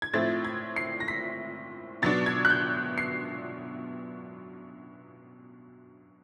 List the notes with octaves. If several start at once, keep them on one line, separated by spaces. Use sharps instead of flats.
G#6
A2 F3 A3 C4 A6
G#6
C7
A#6
B6
B2 F#3 B3 D4 A6
G#6
F#6
G6
C7